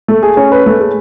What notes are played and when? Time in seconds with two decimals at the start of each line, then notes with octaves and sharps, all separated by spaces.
0.08 A3
0.23 G#4
0.37 C#4
0.52 B4
0.66 A3
0.80 G#4